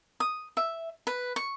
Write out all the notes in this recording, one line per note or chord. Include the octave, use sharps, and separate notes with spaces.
D#6
E5
B4
C#6